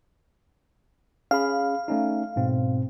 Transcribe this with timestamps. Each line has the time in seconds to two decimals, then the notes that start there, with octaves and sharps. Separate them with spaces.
1.31 C#4 G#4 F5 B5
1.88 A3 C#4 D#4
2.36 G#2 B2 C4